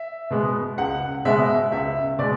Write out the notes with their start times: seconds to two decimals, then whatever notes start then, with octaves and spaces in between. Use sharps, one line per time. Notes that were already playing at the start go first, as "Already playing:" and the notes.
Already playing: E5
0.30 B2 G#3 B3
0.78 C#2 F#5
1.25 B2 G#3 B3 E5
1.72 C#2 E5
2.19 B2 G#3 D5